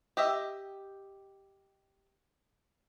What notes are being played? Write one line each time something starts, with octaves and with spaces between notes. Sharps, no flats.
G4 D#5 E5